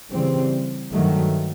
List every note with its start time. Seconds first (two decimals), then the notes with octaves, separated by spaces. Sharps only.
0.11 C#3 E3 G3 C4
0.93 G2 D#3 F#3 A3